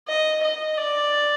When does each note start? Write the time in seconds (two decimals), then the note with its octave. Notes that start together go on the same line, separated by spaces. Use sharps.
0.09 D#5
0.43 D#5
0.78 D5